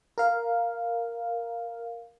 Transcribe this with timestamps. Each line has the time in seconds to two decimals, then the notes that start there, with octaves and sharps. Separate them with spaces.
0.18 A#4 F5